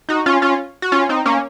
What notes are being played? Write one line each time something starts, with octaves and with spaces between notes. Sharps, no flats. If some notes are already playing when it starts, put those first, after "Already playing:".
D#4 F#4
C#4 F4
C#4 F4
F#4
C#4 F4
C4 D#4
A#3 C#4